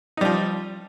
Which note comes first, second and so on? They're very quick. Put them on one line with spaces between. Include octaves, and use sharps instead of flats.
D#4 G3 F3